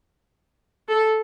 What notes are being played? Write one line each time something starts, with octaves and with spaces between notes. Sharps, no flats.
A4